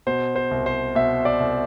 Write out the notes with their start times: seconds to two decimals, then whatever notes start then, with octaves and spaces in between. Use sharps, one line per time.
0.07 B2 C5
0.36 C5
0.51 C2
0.66 C5
0.95 B2 E5
1.25 D5
1.40 C2